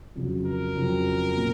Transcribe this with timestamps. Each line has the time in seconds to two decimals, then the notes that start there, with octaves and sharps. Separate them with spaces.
0.16 F2 C#3 F#3
0.46 A#4
0.76 F2 C#3 F#3
1.37 A#2